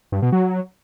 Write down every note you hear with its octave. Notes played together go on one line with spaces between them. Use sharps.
G2
B2
F#3